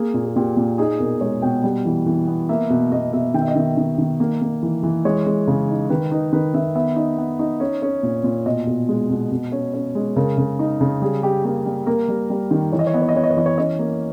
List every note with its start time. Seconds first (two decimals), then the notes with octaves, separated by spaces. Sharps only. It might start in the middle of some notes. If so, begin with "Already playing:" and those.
Already playing: A#3 G#4
0.14 A#2
0.24 G#4
0.36 A#2 G4
0.57 A#2
0.78 D#4 G#4
1.00 B2 A#4
1.21 G#3 C#5
1.42 B2 G5
1.64 G3
1.86 E3
2.06 E3
2.28 B3
2.49 A#3 E5
2.70 B2
2.92 B2 D#5
3.13 B2 E5
3.34 D#3 G5
3.41 E5
3.48 D#5
3.55 D#3 E5
3.77 D#3
3.98 D#3
4.20 A#3
4.41 A#3
4.63 E3
4.83 E3
5.05 G#3 C#5
5.26 G#3
5.47 C#3
5.69 D#4
5.90 D#3 B4
6.11 D#4 B4
6.33 D#3 B4
6.54 D#3 E5
6.75 B3 E5
6.96 D#4
7.18 B3
7.39 D#4
7.60 C#4
7.82 C#4
8.03 A#2
8.24 A#2
8.46 B2 D#5
8.67 B2
8.89 G#3
9.10 B2
9.32 B2
9.52 C#4
9.74 C#4
9.95 G#3
10.16 C#3 A#4
10.38 C#3
10.59 D#4
10.81 C#3
11.02 G3 G#4
11.23 G3 G4
11.44 A#3 G4
11.66 G3
11.87 A#3 A#4
12.08 G3
12.30 G3
12.51 D#3
12.72 E3 C#5
12.79 D#5
12.87 C#5
12.94 B3 D#5
13.02 C#5
13.09 D#5
13.15 B3 C#5
13.24 D#5
13.30 C#5
13.37 E3 D#5
13.46 C#5
13.58 C#4 D#5
13.79 A#3